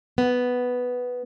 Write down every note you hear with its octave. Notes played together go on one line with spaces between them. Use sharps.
B3